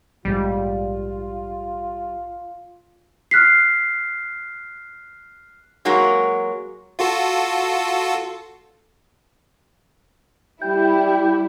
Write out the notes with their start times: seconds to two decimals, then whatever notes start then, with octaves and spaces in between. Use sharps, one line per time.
0.25 A#1 G#2 G3 G#3 F4
3.31 F6 F#6 B6 C7
5.85 F#3 G#3 A#3 F4 F#4
6.99 F4 F#4 A4
10.62 G3 E4 G5